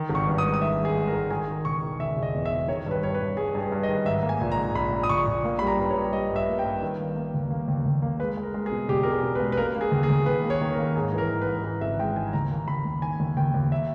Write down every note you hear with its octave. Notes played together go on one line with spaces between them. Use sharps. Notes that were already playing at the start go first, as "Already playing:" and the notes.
Already playing: D#3
G#1
C#6
G2
D#6
G#3
D#6
D#3 E5
G#3
G#4
G#3
A#4
D#3
D#3 G#5
D#3
E1 C#6
D#3
E1 E5
E1
D#5
E2
E5
E1
D#3 C#5
G2 B4
G2 C#5
B4
G2
G2 G#4
G2
G#4
G2
D#5
D#3
G#2 E5
A#3
G#5
A#1
A#5
G#2
A#1 B5
A#1
D#6
A#1 C#6
A#1
A#3
G3 B5
A#5
G2
C#5
G3
G3 D#5
G2
E5
A#3
G5
G2
D#3
A#3
A#3
D#2
A#3
D#2
D#2
A#3
G#3 B4
G#3
A#4
G#3
G#4
B2
E1 G4
B2 A#4
G#4
B2
B4
G#3
B4
A#3 A#4
A#3
G#4
D#2
G#4
D#2
D#3 B4
A#3
C#5
D#3
A#4
A#3
G#2 G#4
E3
A#4
G#2
B4
G#2
E3
G#1 E5
G#3 G5
G#2 G#5
D#2 A#5
A#3
D#2 B5
D#2
D#3 G#5
D#2
D#2 G5
D#2
E5